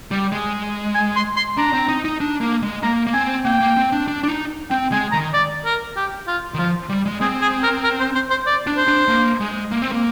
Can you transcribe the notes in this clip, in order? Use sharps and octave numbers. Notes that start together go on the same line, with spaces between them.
G3
G#3
G#5
C6
C6
D4 A#5
C4
D#4
D#4
D4
A#3
G#3
A#3 A#5
A#3
C4 G#5
A#3 G5
A#3
C4
D4
D4
D4
D#4
C4 G5
G#3 G#5
D#3 A#5
D5
A#4
G4
F4
D#3
F3 F4
G3
G#3
C4 G#4
G#4
A#4
A#4
C5
C5
C5
D5
D4
C5
D4
A#3
G#3
A#3
C4
A#3